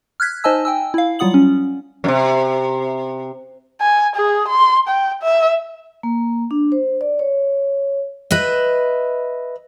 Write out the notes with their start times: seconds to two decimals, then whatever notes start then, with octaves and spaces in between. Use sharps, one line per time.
0.20 F6 F#6 G#6 B6
0.44 D#4 C5 D#5 G#5 A5 E6
0.65 G5 G#5 E6
0.94 E4 F5
1.19 F#3 G3 F4 F#5 D#6 F#7
1.34 C#4
2.04 F#2 C3
3.81 G#5
4.16 G#4
4.48 C6
4.88 G5
5.23 E5
6.03 A#3
6.51 D4
6.72 C5
7.01 D5
7.19 C#5
8.31 B4 D#5 E5